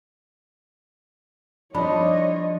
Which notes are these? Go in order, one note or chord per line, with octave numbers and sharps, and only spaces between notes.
F3 G3 D4 D#4 C#5 D#5 B5